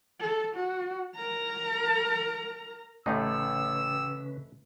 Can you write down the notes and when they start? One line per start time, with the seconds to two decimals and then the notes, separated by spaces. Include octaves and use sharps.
0.20 A4
0.55 F#4
1.15 A#4 A#5
3.06 A1 C#3 E3 A3 C#4 D#4 B4 E6